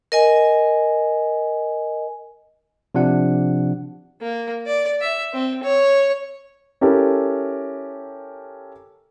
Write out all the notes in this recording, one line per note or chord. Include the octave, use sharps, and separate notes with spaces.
A#4 D#5 G#5
C3 F3 D4 F#5
A#3
D5
E5
C4
C#5
C#4 E4 G4 A4 A#4